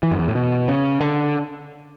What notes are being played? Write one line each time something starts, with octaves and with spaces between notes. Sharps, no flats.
E3
F#2
E2
A2
B2
C#3
D3